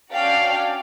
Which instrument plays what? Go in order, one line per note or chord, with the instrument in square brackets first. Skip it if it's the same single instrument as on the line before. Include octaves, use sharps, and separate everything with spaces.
[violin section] C#4 D4 F#4 D5 F5 G5